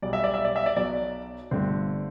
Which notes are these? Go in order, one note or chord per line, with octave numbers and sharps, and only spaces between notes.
B1 B2 G3 D5
E5
D5
E5
D5
E5
D5
B1 B2 F#3 D5
G1 G2 D3 A3 C4